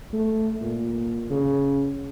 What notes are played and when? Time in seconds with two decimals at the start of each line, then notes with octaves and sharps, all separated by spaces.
0.13 A3
0.61 A#2
1.30 C#3